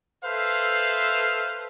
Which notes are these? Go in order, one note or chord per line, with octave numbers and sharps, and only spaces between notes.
A4 B4 C5 E5 F5